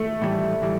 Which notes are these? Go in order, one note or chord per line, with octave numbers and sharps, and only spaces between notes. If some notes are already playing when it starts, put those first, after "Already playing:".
Already playing: A3
A2 E3 G3
A2 E3 G3